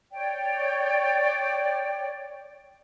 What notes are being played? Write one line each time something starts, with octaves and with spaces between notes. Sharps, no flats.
C#5 D5 G5